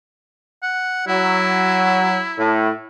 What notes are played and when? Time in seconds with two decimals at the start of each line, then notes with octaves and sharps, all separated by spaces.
0.63 F#5
1.08 F#3 E4
2.37 A2